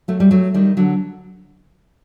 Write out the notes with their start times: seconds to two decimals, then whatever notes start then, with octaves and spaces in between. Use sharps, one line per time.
0.08 F#3 A3
0.20 G3
0.31 F#3 A3
0.54 D#3 G3
0.77 D3 F#3